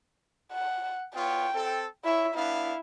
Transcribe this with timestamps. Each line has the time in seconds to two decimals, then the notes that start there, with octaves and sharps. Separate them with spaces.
0.52 F#5
1.15 B3 F4 C#5 G5
1.54 C4 A4
2.05 E4 C#5 E5
2.35 B3 D4 E4 F5